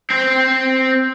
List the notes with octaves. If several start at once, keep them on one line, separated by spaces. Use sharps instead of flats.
C4 C5